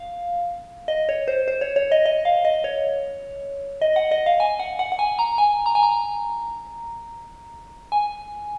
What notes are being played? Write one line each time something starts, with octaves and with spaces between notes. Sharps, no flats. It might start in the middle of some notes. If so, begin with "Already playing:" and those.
Already playing: F5
D#5
C#5
C5
C5
C#5
C#5
D#5
D#5
F5
D#5
C#5
D#5
F#5
D#5
F5
G#5
F#5
F#5
F#5
G#5
A#5
G#5
A#5
G#5
A#5
G#5